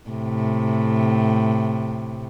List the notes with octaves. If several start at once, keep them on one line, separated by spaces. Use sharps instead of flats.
A2 C3